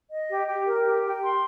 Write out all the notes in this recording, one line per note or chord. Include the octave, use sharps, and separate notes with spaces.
D#5
G4
G4
A#4
G4
G5
C6